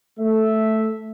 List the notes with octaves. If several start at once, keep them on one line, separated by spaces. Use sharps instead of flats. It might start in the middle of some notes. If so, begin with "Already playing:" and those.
A3 E5